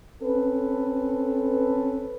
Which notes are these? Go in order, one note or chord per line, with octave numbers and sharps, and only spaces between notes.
C4 C#4 A4 B4